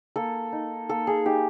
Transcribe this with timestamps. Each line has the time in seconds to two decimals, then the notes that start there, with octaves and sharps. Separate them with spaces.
0.16 A#3 A4
0.53 D#4
0.89 A#3 A4
1.07 G#4
1.25 D#4 G4